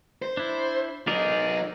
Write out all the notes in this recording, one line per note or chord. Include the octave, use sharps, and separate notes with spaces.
C5
D4 E4
F#3 D#4 G#4 A#4 D5